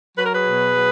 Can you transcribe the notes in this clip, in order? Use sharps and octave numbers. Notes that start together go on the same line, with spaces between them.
F#3 B4
A#4
G#4 B4
B2
F#3